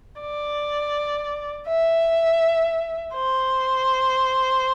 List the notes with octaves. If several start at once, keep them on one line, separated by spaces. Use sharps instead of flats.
D5
E5
C5